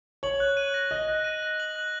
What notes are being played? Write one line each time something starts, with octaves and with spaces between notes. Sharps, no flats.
C#5 F#7
F#6
D#7
A#6
D#5 F#7
F#6
D#7
A#6
F#7
F#6